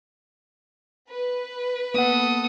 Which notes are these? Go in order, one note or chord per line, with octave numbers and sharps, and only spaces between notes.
B4
A#3 B3 A4 F#5 D#6